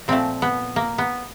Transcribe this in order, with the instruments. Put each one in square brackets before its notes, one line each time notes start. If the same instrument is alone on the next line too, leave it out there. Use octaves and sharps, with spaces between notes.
[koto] A#2 F3 A3 C4
B3
A#3
B3